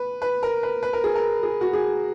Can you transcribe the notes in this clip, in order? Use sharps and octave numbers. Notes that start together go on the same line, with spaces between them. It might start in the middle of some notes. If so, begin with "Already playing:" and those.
Already playing: B4
B4
A#4
B4
B4
A#4
G#4
A#4
G#4
F#4
G#4